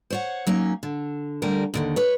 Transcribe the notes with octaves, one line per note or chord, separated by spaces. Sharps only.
C5 C#5 F#5
F#3 A#3 C#4 D#4
D3
D3 G3 A3 G4 A#4
D#2 D3 D#3
B4 C#5